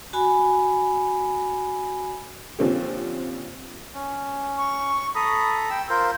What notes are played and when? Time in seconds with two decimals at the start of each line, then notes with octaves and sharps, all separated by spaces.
0.13 F#4 G#5 B5
2.59 A#2 D3 F3 C4 C#4 G4
3.94 C#4
4.58 C#6
5.15 A4 A#5 B5 D#6
5.70 G5 E6
5.89 F4 A#4 C5 G6